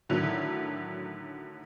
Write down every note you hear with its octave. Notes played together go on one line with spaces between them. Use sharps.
A2 D3 D#3 F#3